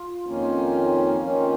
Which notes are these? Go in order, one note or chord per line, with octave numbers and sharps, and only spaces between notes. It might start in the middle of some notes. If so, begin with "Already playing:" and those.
Already playing: F4
F2 D#3 A#3 C#4 F4
F2 D#3 A#3 C#4 F4